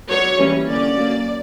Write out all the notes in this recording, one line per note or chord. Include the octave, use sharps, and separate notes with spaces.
F#3 B3 D4 C#5
E3 G3 A#3 C#4
D3 A#3 C#4 D5
F#3 A#3 C#4